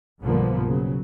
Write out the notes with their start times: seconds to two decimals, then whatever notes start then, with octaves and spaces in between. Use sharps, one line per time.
0.22 B1 G2 D3 F3 A#3 B3
0.66 C#3 F#3